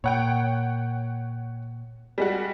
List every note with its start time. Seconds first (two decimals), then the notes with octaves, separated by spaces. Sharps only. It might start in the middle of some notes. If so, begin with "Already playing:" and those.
0.04 A#2 C#5 F#5 G5
2.18 G3 G#3 F#4